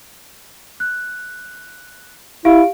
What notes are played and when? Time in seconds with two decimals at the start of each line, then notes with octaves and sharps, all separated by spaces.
0.80 F#6
2.45 E4 G4 F5 D7